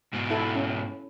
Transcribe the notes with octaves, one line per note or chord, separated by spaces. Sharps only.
G#2 B2
E4 A4
C#4